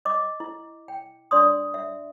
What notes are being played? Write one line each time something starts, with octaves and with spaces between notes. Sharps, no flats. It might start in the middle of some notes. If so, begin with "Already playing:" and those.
D#5 D6
E4
G5
D4 D5 C6 D#6
E5